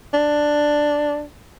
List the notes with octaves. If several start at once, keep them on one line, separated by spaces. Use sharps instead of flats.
D4